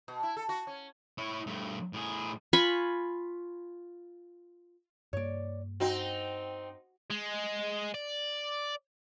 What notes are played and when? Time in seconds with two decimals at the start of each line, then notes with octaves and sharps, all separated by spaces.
0.08 B2
0.23 E4
0.37 A4
0.49 F#4
0.67 C#4
1.18 E4 C#5
1.47 G2 A3
1.93 A2 G#4
2.53 F4 G#5 B5 C#6
5.13 G2 A#3 C#5 D5
5.80 C4 D#4 F#4
7.10 G#3
7.94 D5